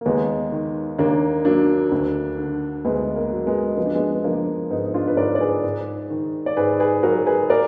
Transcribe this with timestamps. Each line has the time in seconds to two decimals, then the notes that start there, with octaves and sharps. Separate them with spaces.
0.01 A#3
0.06 D#2 G#3 B3
0.52 D#3
0.98 D#2 A#3 D4
1.45 F#3 A#3 D4
1.92 D2
2.38 D3
2.85 D2 G#3 B3
3.16 A#3
3.31 F#3
3.46 G#3 B3
3.77 F3 B3
3.86 D4
3.95 G#3 B3
4.13 B3
4.24 F3 A#3 D4
4.70 G#2 B3 D#4
4.86 D#4
4.94 D4 F4
5.08 B4
5.17 G#2 A#4 D5
5.35 D5
5.40 G#4 B4
5.64 G#2
6.10 D#3
6.46 D5
6.57 G#2 G#4 B4
6.80 G#4 B4
7.03 F#3 F#4 A#4
7.27 G#4 B4
7.50 A#4 D5